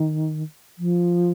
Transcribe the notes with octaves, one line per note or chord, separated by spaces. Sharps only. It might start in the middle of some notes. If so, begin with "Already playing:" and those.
Already playing: D#3
F3